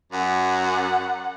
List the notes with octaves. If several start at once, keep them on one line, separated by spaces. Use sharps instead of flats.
F#2 F#5